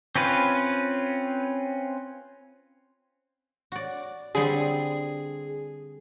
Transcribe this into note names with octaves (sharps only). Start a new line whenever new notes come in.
C4 C#4 F4 B4
F#4 D5
D3 G3 C4 G#4